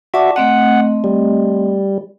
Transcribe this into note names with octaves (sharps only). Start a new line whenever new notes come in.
F#4 D5 E5 A5 D6
A3 C4 D#5 F#5
G3